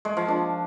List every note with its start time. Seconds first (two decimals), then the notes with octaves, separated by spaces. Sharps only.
0.05 G#3
0.17 F3
0.28 D4